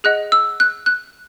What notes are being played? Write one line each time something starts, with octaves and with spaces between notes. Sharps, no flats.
G#4 D#5 F#5 F#6
E6
F#6
F#6